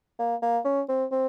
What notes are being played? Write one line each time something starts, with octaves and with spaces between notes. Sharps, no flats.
A#3
A#3
C#4
C4
C4